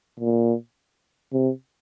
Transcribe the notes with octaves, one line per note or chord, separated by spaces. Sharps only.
A#2
C3